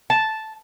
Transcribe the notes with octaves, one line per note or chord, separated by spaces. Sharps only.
A5